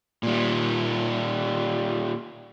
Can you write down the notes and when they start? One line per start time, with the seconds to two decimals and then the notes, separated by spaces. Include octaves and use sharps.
0.23 A#2 G3